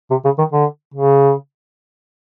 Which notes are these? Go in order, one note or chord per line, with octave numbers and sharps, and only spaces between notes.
C3
C#3
D#3
D3
C#3